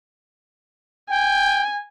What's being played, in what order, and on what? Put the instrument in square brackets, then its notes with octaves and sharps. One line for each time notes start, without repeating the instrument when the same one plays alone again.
[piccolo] G5 [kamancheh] G#5